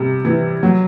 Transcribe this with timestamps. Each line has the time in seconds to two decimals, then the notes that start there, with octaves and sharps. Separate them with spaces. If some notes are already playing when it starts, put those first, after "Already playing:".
Already playing: C3 G3
0.25 E3
0.63 F#3